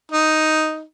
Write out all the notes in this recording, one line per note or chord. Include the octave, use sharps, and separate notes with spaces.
D#4